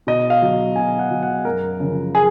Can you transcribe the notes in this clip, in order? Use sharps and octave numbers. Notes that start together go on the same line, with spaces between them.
B2 D#5
F5
F#3
B2 G#5
F#5
F#3
F#5
F#2 A#4
C#3 F3
G#4